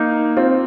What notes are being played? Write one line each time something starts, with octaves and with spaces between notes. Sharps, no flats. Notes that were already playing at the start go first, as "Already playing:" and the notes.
Already playing: A#3 D#4
C4 F4